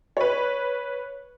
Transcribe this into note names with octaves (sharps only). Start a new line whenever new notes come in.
B4 C#5